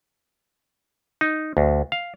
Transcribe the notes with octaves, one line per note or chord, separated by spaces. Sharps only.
D#4
D2
F5